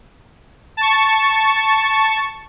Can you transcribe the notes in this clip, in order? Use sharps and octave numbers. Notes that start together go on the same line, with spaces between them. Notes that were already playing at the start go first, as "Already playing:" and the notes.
A5 C#6